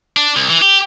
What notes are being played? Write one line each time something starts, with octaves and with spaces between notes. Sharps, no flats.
D4
C2
E3
G4